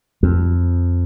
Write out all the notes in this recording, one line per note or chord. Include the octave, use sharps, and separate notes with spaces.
F2